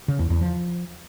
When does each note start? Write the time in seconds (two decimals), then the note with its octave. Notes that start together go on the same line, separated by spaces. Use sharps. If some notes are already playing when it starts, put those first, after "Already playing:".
0.08 C#3
0.19 E2
0.30 E2
0.41 F3